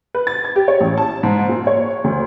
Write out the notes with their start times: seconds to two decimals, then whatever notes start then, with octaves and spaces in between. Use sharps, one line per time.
0.15 B4
0.27 A6
0.45 G#6
0.56 G4
0.68 C#5
0.81 A1
0.98 A5
1.23 G#2
1.49 A#2
1.67 C#5
2.04 D2